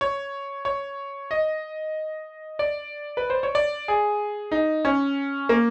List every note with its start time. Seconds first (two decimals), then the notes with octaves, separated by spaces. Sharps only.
0.01 C#5
0.65 C#5
1.31 D#5
2.59 D5
3.17 B4
3.30 C5
3.43 C#5
3.55 D5
3.88 G#4
4.51 D#4
4.85 C#4
5.49 A#3